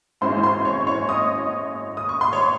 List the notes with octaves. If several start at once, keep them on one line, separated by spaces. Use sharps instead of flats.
G#1 F#2 E3 G#3 C#4 C5 C6
C5 C6
C#5 C#6
C#5 C#6
D#5 D#6
D#6
C#6
C6
C#5 C#6